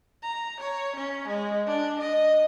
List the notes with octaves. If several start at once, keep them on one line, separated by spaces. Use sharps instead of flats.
A#5
C#5
C#4
G#3
D4
D#5